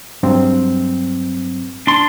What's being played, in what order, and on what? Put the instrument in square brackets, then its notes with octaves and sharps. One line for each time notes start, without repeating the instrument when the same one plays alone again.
[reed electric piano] G2 F#3 C4
[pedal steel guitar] D4 C6